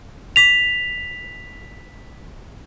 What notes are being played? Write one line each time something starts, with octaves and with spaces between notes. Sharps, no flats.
B6 F7